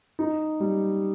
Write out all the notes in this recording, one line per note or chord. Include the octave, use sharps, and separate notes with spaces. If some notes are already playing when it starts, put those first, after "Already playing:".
D#4
G3